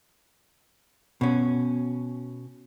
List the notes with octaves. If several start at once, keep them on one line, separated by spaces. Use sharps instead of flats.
B2 C#4